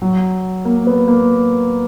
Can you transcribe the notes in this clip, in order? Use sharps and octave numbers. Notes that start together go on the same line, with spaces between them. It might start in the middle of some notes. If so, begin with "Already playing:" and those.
F#3
A#3
B3
A#3